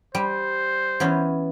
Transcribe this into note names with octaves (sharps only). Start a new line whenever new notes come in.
G3 C5
E3 B3 C#4